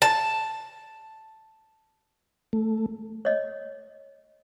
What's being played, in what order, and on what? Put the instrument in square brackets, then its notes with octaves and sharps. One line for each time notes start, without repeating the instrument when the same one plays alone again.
[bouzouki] A5
[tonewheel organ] A3
[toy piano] C#5 D#5